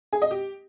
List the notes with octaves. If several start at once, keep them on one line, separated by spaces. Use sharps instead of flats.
G#4
D#5
G4